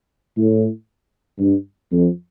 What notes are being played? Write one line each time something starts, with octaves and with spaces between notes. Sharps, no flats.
A2
G2
F2